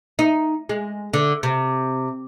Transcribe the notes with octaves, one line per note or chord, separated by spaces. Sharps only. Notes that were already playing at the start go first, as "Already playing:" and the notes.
D#4
G#3
D3
C3